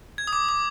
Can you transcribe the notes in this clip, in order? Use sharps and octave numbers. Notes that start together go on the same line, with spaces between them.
G#6
D#6
D6
D6